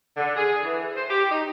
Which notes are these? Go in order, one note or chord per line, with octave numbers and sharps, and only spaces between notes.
D3
G#4
E3
C5
G4
D#4